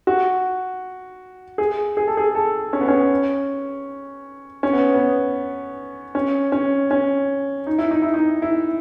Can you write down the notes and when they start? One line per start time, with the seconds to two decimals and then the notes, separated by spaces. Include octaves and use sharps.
0.07 F#4
1.58 G#4
1.97 G#4
2.07 A4
2.17 G#4
2.35 A4
2.73 C#4
2.81 B3
2.88 C#4
4.63 C#4
4.73 B3
4.94 B3
6.15 C#4
6.52 C#4
6.91 C#4
7.67 D#4
7.79 E4
7.91 D#4
8.02 E4
8.14 D#4
8.42 E4